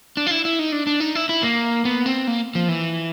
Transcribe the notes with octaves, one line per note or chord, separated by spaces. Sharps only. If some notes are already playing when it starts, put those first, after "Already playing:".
D4
F4
E4
E4
D#4
D4
D4
D#4
E4
E4
A#3
B3
C4
A#3
F3
E3